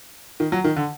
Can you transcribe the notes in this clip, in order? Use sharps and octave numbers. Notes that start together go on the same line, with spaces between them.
D#3
F#3
D#3
D3